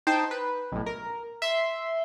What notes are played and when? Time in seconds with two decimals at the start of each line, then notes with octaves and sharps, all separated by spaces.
0.07 D#4 C5 G5 A5
0.31 B4
0.72 B1 A2
0.86 A#4
1.42 E5 C6